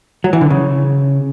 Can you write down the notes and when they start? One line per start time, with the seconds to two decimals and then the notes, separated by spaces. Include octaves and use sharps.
0.24 F#3
0.33 E3
0.41 D3
0.50 C#3